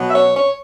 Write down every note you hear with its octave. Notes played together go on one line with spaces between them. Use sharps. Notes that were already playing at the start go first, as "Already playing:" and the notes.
Already playing: B2 F#3 B3
E5
C#5
C#5